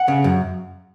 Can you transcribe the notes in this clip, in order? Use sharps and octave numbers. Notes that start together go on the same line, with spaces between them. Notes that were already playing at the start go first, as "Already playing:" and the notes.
Already playing: F#5
C#3
F#2